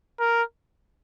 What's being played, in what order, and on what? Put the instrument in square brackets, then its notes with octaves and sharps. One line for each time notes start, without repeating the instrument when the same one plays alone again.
[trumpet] A#4